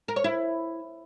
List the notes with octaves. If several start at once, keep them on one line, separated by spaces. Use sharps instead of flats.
A#4
C#5
E4